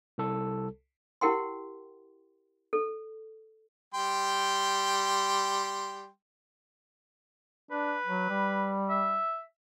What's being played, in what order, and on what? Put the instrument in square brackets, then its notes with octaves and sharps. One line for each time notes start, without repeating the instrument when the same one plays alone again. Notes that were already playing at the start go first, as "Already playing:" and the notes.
[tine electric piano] C2 A4
[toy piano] E4 G4 A#4 F#5 G5 C6
A4
[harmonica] G3 G5 C6
[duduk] D4 [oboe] B4
[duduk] F#3
G3
[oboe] E5